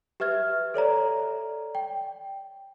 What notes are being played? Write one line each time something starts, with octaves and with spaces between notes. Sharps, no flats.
G4 B4 E5 F6 G#6
A4 C#5 D5 A#5
G5